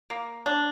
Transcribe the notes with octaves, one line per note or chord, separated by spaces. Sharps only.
A#3
D4